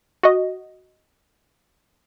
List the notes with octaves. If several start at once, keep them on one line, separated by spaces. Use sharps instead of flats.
F#4 D#5